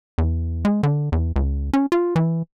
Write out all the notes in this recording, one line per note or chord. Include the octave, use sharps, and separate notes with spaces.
E2
G#3
D3
E2
C#2
C#4
F4
E3